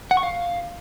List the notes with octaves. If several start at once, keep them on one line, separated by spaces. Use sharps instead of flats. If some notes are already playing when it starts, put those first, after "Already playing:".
F#5
C#6
F5